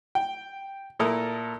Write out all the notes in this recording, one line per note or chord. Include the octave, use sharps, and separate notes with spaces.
G5
A#2 E4 A4 A#4 A#5 D#6